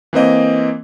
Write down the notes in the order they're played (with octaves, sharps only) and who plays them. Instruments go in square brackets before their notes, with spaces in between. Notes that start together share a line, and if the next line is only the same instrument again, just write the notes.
[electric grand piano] E3 A#3 C4 D#5